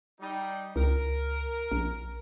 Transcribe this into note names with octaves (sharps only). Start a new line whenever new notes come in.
G3 D#4
C#2 A#4
A#1